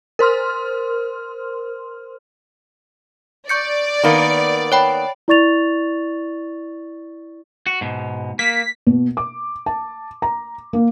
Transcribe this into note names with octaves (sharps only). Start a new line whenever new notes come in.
A#4 C5 C6 F6
D5 C#6 G6 C#7
D#3 A#3 B3
C#5 G5 B5
E4 D5 C#6 A6 F7
F#4
G#2 B2
A#3 B6
B2
D6
A5
A#5
A#3